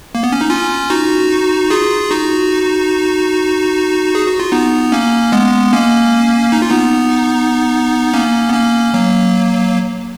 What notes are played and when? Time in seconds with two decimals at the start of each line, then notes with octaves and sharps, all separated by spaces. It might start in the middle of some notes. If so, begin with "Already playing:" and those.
0.15 A#3
0.23 B3
0.32 C#4
0.41 D#4
0.50 C#4 F4
0.90 D#4 F#4
1.70 F4 G#4
2.11 D#4 F#4
4.15 G#4
4.27 F#4
4.40 F4
4.52 B3 D#4
4.92 A#3 C#4
5.32 G#3 B3
5.73 A#3 C#4
6.52 D#4
6.62 F4
6.70 B3 D#4
8.13 A#3 C#4
8.49 B3
8.54 A#3 C#4
8.94 F#3 A#3